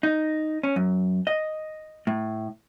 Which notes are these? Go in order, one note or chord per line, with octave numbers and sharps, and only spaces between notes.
D#4
C#4
F#2
D#5
A2